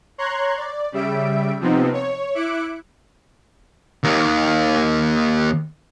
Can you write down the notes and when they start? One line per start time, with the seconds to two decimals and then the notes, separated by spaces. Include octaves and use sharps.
0.18 C#5 A#5 C6 F#6 G#6
0.57 D5
0.92 C#3 G3 E5 D7
1.60 C3 F3 B3 C4 D#4
1.93 C#5
2.35 E4 D6 F#6 C#7 D7
4.04 D#2 D#3